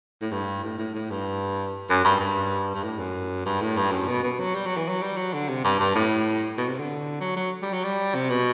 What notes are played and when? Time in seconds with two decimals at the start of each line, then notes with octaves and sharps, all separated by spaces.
0.21 A2
0.32 G2
0.63 A2
0.79 A2
0.95 A2
1.10 G2
1.89 F#2
2.05 G2
2.20 G2
2.75 G2
2.83 A2
2.98 F#2
3.45 G2
3.61 A2
3.77 G2
3.92 F#2
4.07 B2
4.23 B2
4.40 F#3
4.55 G3
4.66 F#3
4.77 E3
4.89 F#3
5.02 G3
5.17 F#3
5.33 D3
5.49 C3
5.64 G2
5.79 G2
5.95 A2
6.57 B2
6.68 C3
6.79 D3
7.21 F#3
7.36 F#3
7.62 G3
7.73 F#3
7.84 G3
8.15 C3
8.30 B2